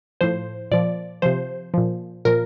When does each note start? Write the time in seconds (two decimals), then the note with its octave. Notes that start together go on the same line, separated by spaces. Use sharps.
0.21 A2 F3 C5
0.71 A#2 F3 D5
1.22 C3 F3 C5
1.74 A#2 F3
2.25 A#2 F3 A#4